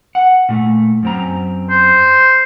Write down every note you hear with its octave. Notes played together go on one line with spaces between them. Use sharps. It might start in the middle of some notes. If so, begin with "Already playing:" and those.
F#5
A#2 A3
F#2 C4 A#5
C5